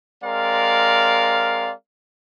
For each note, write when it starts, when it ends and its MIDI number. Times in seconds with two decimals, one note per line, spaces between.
0.23 1.72 56
0.23 1.72 60
0.23 1.72 70
0.23 1.72 74
0.23 1.72 77